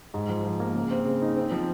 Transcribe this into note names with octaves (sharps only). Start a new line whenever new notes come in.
G#2
F3
F3
A#3
C#3
C4
C#3
D#4
C4
F3